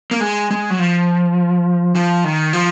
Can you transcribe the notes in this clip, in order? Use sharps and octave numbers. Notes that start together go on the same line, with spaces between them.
A#3
G#3
G#3
F#3
F3
F3
D#3
F3